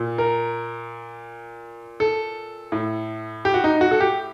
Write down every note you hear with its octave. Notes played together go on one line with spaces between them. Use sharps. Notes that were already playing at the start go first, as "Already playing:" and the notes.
Already playing: A#2
A#4
A4
A2
G4
F#4
D#4
F#4
A4
G4